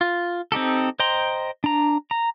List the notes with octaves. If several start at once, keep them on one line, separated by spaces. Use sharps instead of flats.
F4
C4 D#4 G4 A4
C5 D#5 G5 A#5 C6
D4 A#5
A#5